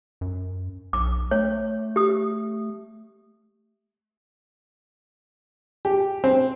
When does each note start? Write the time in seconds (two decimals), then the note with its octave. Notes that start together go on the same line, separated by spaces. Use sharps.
0.21 F#2
0.93 B1 D6
1.31 A3 C#5
1.96 G4 D#6
5.85 G4
6.24 C4